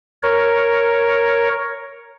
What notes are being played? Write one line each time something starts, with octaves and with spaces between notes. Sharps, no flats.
A#4 C#5